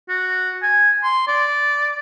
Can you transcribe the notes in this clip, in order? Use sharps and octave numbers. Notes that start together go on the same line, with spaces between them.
F#4
G#5
C6
D5